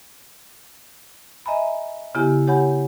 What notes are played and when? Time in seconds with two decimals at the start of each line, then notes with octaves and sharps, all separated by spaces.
1.46 D#5 E5 G#5 A#5 B5
2.15 C#3 B3 E4 G4 G#5
2.47 G4 C#5 F#5 G#5 B5 G6